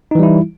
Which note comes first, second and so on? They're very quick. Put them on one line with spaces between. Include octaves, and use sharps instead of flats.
D#4 E3 G3 E4